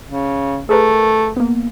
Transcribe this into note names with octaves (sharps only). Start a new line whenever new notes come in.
C#3
A3 G#4 A#4 B4
A#3 B3